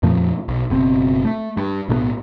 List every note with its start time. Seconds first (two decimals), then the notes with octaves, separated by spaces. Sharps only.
0.03 F2 A#2 F3 A3
0.48 B1
0.70 F#1 B2 C4
1.25 A3
1.57 G2
1.89 B1 A2 F#3 B3